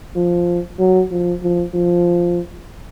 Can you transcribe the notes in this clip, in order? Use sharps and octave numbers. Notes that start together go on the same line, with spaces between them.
F3
F#3
F3
F3
F3